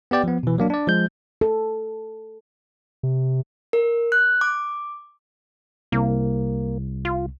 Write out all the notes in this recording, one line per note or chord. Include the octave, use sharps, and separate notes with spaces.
B3 G4 D5 G5
F3 B3
B2 E3
F#3 A#3 D4
D4 D5
F3 G#3 G6
A4
C3
A#4
F#6
D6
C2 A#3
F4